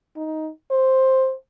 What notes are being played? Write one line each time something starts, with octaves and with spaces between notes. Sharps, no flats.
D#4
C5